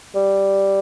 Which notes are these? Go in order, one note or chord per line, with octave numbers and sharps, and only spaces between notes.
G3